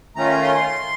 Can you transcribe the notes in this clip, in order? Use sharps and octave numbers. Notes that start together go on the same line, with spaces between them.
D#3 A3 C#4 F4 A#5
C6